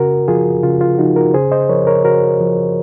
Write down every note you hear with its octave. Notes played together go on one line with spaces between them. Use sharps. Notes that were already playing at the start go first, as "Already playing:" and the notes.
Already playing: C#3 F#4 A#4
F3 F4 G#4
C#3 F4
F4
F3 D#4 F#4
F#4 A#4
C#3 G#4 C5
C5 D#5
F3 A#4 C#5
A#4 C#5
C#3 F#4 A#4
F3